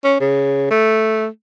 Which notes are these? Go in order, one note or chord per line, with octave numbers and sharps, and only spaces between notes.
C#4
C#3
A3